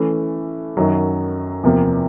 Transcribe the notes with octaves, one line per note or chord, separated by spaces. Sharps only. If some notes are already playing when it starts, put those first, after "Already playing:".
Already playing: E3 A3 C#4
F#2 D#3 F#3
E2 C3 F3 A#3